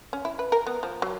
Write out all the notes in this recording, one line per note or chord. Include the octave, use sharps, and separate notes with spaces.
C#4
E4
B4
A#4
B3
F3
F#3